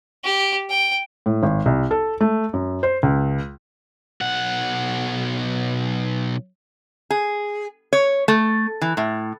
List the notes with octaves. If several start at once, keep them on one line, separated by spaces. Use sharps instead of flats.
G4
G5
A2
G#1
C2
A4
A3
F#2
C5
C#2
B1 F#5
G#4
C#5
A3
E3
A2